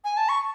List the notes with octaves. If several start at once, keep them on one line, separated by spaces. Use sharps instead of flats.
G#5
A5
C#6